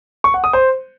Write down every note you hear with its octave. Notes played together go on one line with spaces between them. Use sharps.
C#6
F#5
D#6
C5